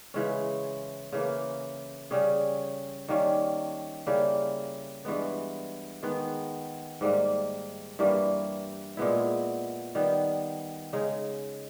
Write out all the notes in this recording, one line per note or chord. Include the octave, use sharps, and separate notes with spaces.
C#3 E3 G#3 C#4
C#3 E3 A#3
C#3 G3 C#4 G#4
D#3 G3 A#3 C#4
C#3 G3 A#3 E4
G2 E3 G#3 B3
D#3 G#3 B3
G#2 G3 A#3
G2 E3 G3 A#3
A#2 G#3 B3 E4
D#3 G3 B3
C#3 G#3 D#4